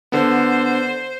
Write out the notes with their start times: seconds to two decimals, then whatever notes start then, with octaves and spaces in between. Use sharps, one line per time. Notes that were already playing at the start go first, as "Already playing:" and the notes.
0.12 D3 B3 C5